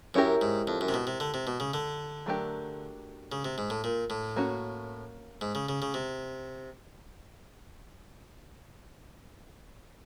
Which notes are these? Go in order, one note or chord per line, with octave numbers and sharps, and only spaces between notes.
F#2 C#4 E4 G4 A#4
G#2
F2
F#2
C3
B2
C3
D3
C3
B2
C#3
D3
F#3 A3 D4 G4 A#4
C#3
C3
G#2
A2
A#2
A2
A#3 C#4 F#4
G#2
C#3
C#3
C#3
C3